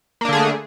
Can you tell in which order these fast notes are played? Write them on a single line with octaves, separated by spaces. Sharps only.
A#3 D4 D3 G#4 A3